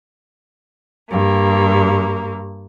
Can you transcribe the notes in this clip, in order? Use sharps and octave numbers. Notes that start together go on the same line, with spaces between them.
G2 A#3